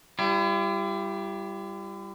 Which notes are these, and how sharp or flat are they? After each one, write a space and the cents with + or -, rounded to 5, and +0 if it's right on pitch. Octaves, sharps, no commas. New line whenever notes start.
G3 +0 E4 +45